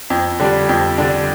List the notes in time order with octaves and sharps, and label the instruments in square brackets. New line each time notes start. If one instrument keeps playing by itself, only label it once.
[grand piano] F2
D3 G3 D4
F2
D3 G3 D4